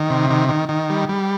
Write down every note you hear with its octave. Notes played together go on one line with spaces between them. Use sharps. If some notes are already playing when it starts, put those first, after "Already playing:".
Already playing: D#3
C3
D#3
D#3
D#3
G3
G3